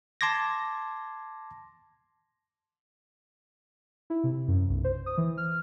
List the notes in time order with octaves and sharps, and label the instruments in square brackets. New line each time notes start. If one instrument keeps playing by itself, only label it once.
[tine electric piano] A5 C6 D6 G#6 A#6
[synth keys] E4
C3
F#2
B1
C5
D#6
E3
F6